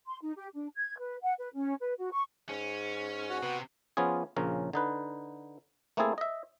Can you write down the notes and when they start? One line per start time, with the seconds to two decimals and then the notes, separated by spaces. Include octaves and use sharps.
0.06 C6
0.22 D#4
0.36 G4
0.55 D4
0.76 G#6
0.99 B4
1.23 F#5
1.39 B4
1.54 C#4
1.81 B4
1.99 F#4
2.12 C#6
2.49 G#2 C#4
3.30 F#4
3.43 C3 B3
3.97 F3 B3 C#4 F4 G#4
4.36 A#1 C#3 F3 C#4 A#4
4.73 D3 D#4 B4
5.97 A3 A#3 C4 E4 G#4 A4
6.18 D#5 E5